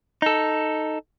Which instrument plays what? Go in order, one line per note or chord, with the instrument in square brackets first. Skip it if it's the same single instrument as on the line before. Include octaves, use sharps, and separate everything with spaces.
[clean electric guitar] D#4 A4